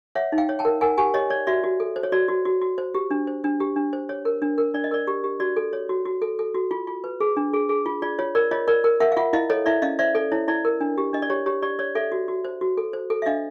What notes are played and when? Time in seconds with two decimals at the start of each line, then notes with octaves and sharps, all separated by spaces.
0.15 C#5 E5 F#5
0.32 D#4
0.38 F5 G5
0.49 C#5
0.59 G5 A5
0.65 A#4
0.81 A#4 F#5 G#5
0.98 G4 F#5 G#5
1.14 G4 C#5 D#5
1.30 C#5 D5
1.47 F#4 D5 E5
1.64 F#4
1.80 A4
1.96 C5
2.03 C#5
2.12 F#4 D5
2.28 F#4
2.45 F#4
2.61 F#4
2.78 C5
2.94 G4
3.11 D4
3.27 C5
3.44 D4
3.60 G4
3.76 D4
3.93 C5
4.09 C#5
4.25 A#4
4.42 D4
4.58 A#4
4.74 D4 D5
4.84 D#5
4.91 A#4 D5
5.07 G4
5.24 G4
5.40 F#4 D5
5.56 A4
5.73 C#5
5.89 F#4
6.06 F#4
6.22 A4
6.39 A4
6.55 F#4
6.71 F4
6.87 F4
7.04 B4
7.20 G#4
7.37 D4
7.53 G#4
7.69 G#4
7.86 F4
8.02 F4 D5
8.19 F4 C#5
8.35 A#4 D5
8.51 F4 C#5 D#5
8.68 A#4 D5
8.84 A#4
9.00 A#4 E5 F#5
9.12 F5
9.17 F4 E5 F#5
9.33 E4 D#5 F5
9.50 A4 C#5 D#5
9.66 E4 D5 E5
9.82 C#4 D#5 F5
9.99 C5 D5 E5
10.15 A4 D5
10.32 E4 C#5
10.48 E4 D5
10.65 A#4
10.80 D4
10.98 G4
11.13 D4 D#5
11.22 D5
11.30 G4 C#5
11.46 G4 C#5
11.63 G4 D5
11.79 C#5 D5
11.95 A4 D5 E5
12.12 F#4
12.28 F#4
12.45 C5
12.61 F#4
12.77 A4
12.93 C5
13.10 A4
13.22 E5
13.26 D4 D#5 F5